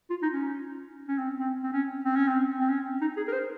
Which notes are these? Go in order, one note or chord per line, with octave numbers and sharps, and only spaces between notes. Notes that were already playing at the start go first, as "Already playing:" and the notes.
F4
D#4
C#4
C#4
C4
C4
C4
C#4
C4
C#4
C4
C4
C#4
D#4
G#4
A#4
C5